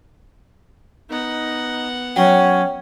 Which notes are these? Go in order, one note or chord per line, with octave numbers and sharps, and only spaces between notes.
B3 D#4 F#5
F#3 C#4 C#5 G5